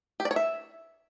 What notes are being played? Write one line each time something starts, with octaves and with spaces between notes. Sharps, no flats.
G4
D5
C#5
E5